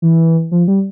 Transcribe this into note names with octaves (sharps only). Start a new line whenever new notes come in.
E3
F3
G3